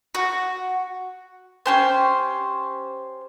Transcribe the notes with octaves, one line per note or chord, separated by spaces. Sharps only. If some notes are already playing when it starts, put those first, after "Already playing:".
F#4
C#4 G4 C5